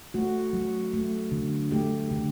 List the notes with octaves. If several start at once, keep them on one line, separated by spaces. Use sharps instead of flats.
A3 F#4
F#3
A3
D3
A3 G4
D3